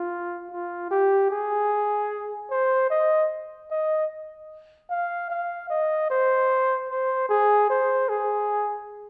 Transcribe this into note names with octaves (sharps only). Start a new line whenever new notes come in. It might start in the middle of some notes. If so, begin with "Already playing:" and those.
Already playing: F4
F4
G4
G#4
C5
D#5
D#5
F5
F5
D#5
C5
C5
G#4
C5
G#4